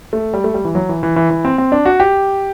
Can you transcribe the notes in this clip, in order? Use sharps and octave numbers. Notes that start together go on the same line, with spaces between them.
A3
G3
A3
G3
E3
F#3
E3
E3
E3
E3
C4
C4
D4
F#4
G4